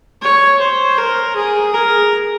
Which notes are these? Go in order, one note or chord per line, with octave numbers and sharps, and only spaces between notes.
C#5
C5
A#4
G#4
A#4